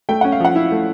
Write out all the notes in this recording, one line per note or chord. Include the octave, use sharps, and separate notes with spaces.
A3 G5
C#4 F#5
F5
F3 F#5
E4
A3